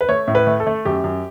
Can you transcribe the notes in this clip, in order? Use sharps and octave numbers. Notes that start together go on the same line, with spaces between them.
B4
A3 C#5
A2
B4
A3
A4
A3
F#2 G4
F#2